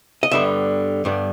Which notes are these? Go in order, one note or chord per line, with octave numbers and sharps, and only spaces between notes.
D#5
G2 D3 G3 B3 E5
G2 D3 G3 B3